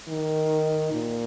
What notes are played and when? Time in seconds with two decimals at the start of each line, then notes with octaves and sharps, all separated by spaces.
0.08 D#3
0.93 A#2